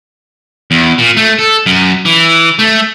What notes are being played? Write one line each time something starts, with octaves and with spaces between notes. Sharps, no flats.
E2
A#2
A3
A4
F#2
E3
A3